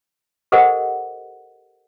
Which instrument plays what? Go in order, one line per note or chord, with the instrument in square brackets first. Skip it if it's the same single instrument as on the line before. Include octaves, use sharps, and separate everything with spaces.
[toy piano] G4 A4 A#4 C5 D#5 F#5